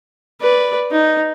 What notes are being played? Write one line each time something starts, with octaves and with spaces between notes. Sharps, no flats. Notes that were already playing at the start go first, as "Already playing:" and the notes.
B4 D5
D#4